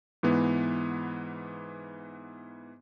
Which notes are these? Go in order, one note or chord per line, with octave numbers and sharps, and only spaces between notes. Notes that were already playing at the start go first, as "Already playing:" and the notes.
G#2 E3 B3